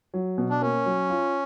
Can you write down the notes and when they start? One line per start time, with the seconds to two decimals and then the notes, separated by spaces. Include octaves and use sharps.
0.14 F#3
0.38 B2
0.50 D4
0.61 A#3 C#4
0.85 F#3
1.10 F4